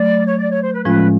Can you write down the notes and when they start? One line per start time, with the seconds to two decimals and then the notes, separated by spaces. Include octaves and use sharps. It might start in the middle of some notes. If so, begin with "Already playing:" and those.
Already playing: F#3 A3 D5
0.27 C#5
0.38 D5
0.51 C#5
0.62 C5
0.74 B4
0.85 A2 F3 G#3 C#4 F4 B4